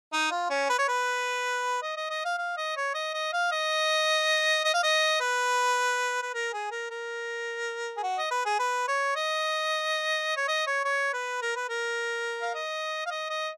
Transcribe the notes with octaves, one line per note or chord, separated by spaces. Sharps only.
D#4
F4
C#4
B4
C#5
B4
D#5
D#5
D#5
F5
F5
D#5
C#5
D#5
D#5
F5
D#5
D#5
F5
D#5
B4
B4
A#4
G#4
A#4
A#4
G#4
F#4
D#5
B4
G#4
B4
C#5
D#5
C#5
D#5
C#5
C#5
B4
A#4
B4
A#4
F5
D#5
F5
D#5
D#5